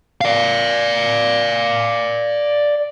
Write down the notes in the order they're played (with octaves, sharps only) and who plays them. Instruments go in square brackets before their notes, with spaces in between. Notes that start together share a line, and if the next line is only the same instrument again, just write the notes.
[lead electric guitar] D5 F5